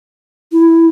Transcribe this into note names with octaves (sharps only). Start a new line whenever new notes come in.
E4